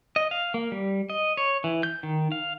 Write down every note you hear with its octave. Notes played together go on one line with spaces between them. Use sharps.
D#5
F5
A#3
G3
D#5
C#5
E3
G6
D#3
F5